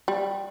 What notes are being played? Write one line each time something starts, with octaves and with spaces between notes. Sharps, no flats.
G3